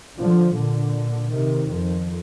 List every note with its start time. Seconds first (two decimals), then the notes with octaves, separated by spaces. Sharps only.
0.17 D3 F3
0.55 A#2 D3
1.30 C3 D#3
1.68 F2